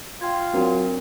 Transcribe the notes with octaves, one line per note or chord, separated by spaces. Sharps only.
F4 G5 G#6
F#3 C4 D4 A#4